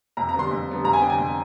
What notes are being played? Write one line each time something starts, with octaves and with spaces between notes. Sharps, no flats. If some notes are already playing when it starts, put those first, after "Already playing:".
F2 A#5
A#5
D3 G3 B3 C6
F2
D3 G3 B3
F2 A#5
G#5
D3 G3 B3 G5
G#5
F2